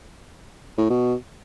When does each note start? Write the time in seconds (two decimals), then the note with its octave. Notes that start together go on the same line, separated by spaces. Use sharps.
0.78 A2
0.90 B2